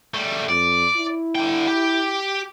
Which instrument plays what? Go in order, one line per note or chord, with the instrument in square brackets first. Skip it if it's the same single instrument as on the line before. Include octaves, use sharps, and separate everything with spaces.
[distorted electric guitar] G3 A3
[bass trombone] F2 [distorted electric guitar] D5
[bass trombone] E4
[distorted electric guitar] D3 G5
G4